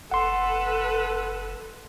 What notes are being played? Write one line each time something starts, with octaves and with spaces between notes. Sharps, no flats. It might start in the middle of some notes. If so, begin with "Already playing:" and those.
F#1 A4 B4 F#5 C6